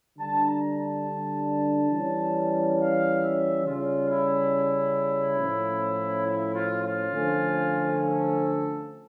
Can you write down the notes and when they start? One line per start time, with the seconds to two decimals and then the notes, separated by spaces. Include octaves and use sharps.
0.18 D3 G3 D4 A5
0.47 A#5
0.77 A5
1.92 E3 G3 C#4
2.78 F5
3.22 E5
3.65 C#3 G3 C#4 F4
4.09 E4
5.39 A2 F3 C#4
6.26 E4
6.55 F4
6.83 F4
7.12 D3 F3 A3 C#4
7.98 A4